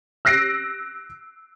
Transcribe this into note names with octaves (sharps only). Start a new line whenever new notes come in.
E6 F#6 A#6 C7 D7